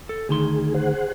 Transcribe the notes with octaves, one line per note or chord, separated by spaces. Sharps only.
A4
D2 D#3 G#4 C6
G#4 C5 F#5